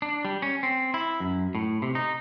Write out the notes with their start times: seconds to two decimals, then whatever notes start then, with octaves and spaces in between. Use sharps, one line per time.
0.02 D4
0.25 G3
0.42 C#4
0.63 C4
0.94 E4
1.20 F#2
1.55 A2
1.82 C3
1.95 D#4